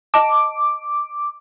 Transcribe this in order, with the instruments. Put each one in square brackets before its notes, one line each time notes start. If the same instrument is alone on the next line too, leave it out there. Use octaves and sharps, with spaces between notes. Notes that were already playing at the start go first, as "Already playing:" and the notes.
[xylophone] D#5 A5 [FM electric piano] D6